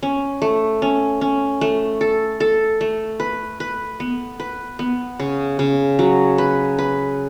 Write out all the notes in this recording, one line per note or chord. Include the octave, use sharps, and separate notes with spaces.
C#4
A3
C#4
C#4
A3
A4
A4
A3
B4
B4
B3
B4
B3
C#3
C#3
F#3
B4
B4